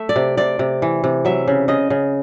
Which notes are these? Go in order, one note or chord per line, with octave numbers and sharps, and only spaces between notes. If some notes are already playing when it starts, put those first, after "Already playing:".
Already playing: A3 E5
D5
C3
C3 D5
C3
E3
C3
F#3 E5
C#3
C#3 D#5
C#3